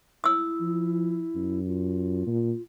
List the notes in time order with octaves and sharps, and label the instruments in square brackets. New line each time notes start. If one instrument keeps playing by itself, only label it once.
[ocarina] E4 [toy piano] D#6 E6
[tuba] F3
F#2
[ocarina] F4
[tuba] A#2